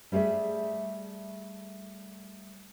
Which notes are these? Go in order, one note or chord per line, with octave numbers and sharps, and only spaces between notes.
G3 A3 G#4 D5 E5